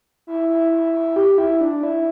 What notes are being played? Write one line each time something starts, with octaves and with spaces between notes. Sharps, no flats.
E4
E4
E4
E4
G4
E4
D4
E4